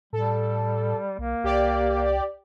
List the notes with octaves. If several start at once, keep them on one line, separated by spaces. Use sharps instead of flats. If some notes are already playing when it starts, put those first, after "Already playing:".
A2 G3 A4
B1 A#3
C2 G4 D5